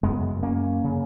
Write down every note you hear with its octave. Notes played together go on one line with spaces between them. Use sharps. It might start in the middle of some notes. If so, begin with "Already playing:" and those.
F#2 C#3 G#3 B3
A#3 C#4
C#3